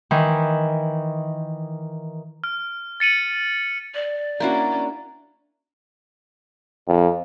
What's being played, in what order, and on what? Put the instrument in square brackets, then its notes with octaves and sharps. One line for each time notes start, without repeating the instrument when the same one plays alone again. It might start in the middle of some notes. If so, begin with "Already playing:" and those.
[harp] D#3 E3
[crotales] F6
A6 C#7 D#7 F#7
[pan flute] D5
[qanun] A#3 E4 F#4 [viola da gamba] C#4 D4
[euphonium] F2